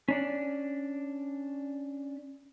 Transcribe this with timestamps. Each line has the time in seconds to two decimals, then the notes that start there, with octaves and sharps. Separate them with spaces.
0.08 C#4 D4 D5